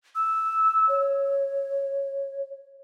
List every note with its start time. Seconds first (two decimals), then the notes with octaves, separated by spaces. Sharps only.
0.15 E6
0.89 C#5